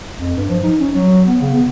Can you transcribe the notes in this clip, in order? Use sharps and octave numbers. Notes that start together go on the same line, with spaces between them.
F2
G2
F3
D#4
C#4
F#3
B3
C#3
B3